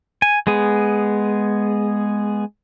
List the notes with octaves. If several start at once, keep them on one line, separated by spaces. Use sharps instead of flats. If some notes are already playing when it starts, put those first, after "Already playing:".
G#5
G#3 B3 G#4